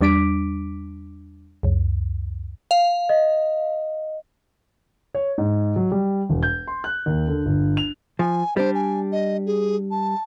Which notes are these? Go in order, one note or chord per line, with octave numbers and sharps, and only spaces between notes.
E2 G3 D4 D6 B6 D7
C#2 F#2
F5
D#5
C#5
G#2
F#3
G3
E1
G6
C6
F#6
D#2
D3
G1
F7
F3 G#5
G3 D4 C5
G#5
D#5
G#4
A5